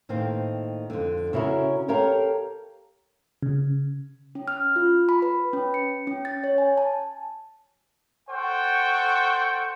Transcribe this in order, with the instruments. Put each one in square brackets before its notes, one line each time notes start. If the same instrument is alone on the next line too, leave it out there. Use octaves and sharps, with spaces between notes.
[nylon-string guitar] A2 D#3 A#3 C4
F2 D3
C#3 C#4 E4 F#4 A#4
G4 A4 A#4 C#5 F5
[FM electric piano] C#3
[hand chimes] C#4
F6
F4
B5
B4
C#4
C#7
C#4
A6
C#5
G#5
A5
[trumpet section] A4 C5 F#5 G5 C#6